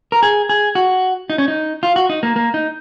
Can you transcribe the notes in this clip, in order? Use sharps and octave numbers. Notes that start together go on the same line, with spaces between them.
A#4
G#4
G#4
F#4
D#4
C#4
D#4
F4
F#4
D#4
A#3
A#3
D#4